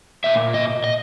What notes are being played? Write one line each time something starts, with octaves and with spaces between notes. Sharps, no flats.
A#2 A#3 E5
D#5
D#5